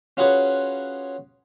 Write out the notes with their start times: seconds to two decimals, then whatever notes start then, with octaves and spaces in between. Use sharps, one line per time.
0.17 C#4 F4 F#4 G#4 B4 C#5